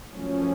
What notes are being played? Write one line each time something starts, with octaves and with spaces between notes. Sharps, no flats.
F#2 F3 A3 C#4